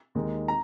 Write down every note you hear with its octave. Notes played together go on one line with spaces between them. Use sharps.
D#2 D#3 G#3
A#5